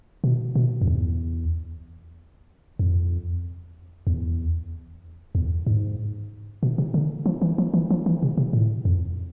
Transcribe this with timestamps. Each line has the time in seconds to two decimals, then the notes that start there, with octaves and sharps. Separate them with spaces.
0.24 B2
0.55 B2
0.82 F2
0.88 E2
2.79 F2
4.07 E2
5.35 E2
5.67 G#2
6.63 B2
6.78 C3
6.94 D3
7.26 F3
7.42 E3
7.58 F3
7.74 E3
7.90 F3
8.06 E3
8.23 C3
8.37 C3
8.53 A2
8.85 F2